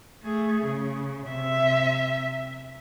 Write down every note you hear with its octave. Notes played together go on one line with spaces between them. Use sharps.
A3 G#4
C#3
C3 E5